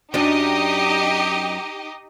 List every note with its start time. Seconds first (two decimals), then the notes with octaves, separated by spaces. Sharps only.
0.14 F#2 F#3 D4 D#4 G4 D#5